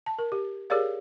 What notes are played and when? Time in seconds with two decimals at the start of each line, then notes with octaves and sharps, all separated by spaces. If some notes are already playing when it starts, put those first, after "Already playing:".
0.06 A5
0.19 A#4
0.32 G4
0.70 G4 G#4 A#4 C#5 D5 F5